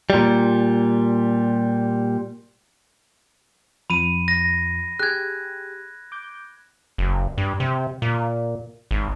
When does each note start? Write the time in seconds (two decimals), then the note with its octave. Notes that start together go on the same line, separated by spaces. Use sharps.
0.10 A#2 G3
3.90 F2 F3 B5 D#7
4.28 A#6
4.99 G4 G#4 F#6 G#6
6.12 D6 G6
6.98 F#1
7.38 G2
7.60 C3
8.02 A#2
8.91 G#1